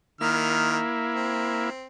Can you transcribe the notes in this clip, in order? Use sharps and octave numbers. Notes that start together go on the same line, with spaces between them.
D#3 A#3 E4 F6
C4